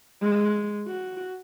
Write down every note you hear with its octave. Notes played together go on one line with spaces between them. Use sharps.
G#3
F#4